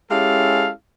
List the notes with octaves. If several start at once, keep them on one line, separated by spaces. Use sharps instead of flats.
G#3 C#4 E4 G4 A4 F5